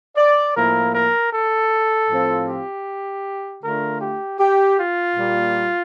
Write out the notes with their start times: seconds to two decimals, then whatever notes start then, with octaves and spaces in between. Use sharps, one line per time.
0.17 D5
0.55 A2 F3 A#3 E4 A#4
0.94 A#4
1.32 A4
2.09 A2 F3 C4 F4
2.48 G4
3.62 D3 A3 D4 F4 A#4
4.01 G4
4.39 G4
4.77 F4
5.16 A#2 G3 A#3